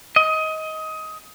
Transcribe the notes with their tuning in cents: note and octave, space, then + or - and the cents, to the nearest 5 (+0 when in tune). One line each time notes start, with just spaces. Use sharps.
D#5 +20